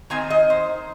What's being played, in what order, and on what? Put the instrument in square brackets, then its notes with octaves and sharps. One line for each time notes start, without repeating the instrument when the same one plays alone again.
[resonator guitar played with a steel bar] D#3 C4 D#4 G#5
D#5
C5